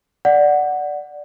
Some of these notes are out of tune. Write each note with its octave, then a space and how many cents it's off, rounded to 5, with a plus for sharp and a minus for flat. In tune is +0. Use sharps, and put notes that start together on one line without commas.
D5 +0 F#5 +0